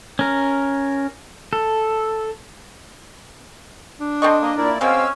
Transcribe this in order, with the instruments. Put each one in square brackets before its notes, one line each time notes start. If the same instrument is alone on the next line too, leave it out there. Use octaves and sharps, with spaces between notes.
[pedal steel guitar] C#4 A#4
A4
[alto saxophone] D4
[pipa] C4 A4 C#6 [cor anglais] D#5
[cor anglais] A#3 [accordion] D#5
[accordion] A#2 E4 D5 [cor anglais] A#4
[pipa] B2 G#3 A#3 [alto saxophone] C4 [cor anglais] C#4 [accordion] F5 E6